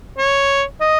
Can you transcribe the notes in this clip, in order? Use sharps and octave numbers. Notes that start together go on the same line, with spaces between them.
C#5
D#5